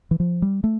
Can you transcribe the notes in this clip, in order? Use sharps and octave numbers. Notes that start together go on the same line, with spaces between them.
E3
F3
G3
A3